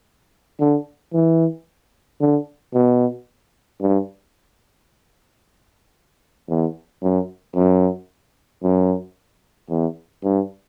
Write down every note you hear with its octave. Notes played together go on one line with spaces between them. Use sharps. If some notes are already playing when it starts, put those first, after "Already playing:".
D3
E3
D3
B2
G2
E2
F#2
F#2
F#2
E2
G2